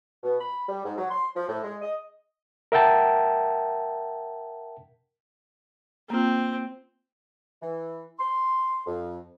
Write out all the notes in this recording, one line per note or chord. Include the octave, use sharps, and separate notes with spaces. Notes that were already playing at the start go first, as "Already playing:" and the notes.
B2
B5
G3
G#2
F#3
C6
F3
A2
G#3
D#5
A#4 E5 F#5 G5 A5
A#3 C4 F4
E3
C6
F2